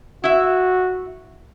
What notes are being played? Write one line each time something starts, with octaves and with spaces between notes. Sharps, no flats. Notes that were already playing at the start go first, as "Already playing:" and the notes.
E4 F#4 E5